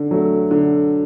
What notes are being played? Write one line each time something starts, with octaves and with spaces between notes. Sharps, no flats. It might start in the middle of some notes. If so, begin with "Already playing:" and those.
Already playing: D3
F#3 A3
D3